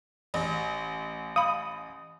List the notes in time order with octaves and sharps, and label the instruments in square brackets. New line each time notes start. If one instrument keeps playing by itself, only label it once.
[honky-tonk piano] A1
[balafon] F5 B5 [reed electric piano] D#6